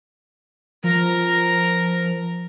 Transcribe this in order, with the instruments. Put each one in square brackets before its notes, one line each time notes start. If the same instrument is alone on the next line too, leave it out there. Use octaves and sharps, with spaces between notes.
[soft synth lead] F3 [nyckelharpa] A#4 A#5